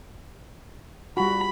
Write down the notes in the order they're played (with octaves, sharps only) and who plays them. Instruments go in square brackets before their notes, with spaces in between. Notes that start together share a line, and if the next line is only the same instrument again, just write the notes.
[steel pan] G3 F4 F#4 [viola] B5